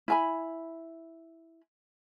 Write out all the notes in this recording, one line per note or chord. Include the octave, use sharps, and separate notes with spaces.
E4 G#5 B5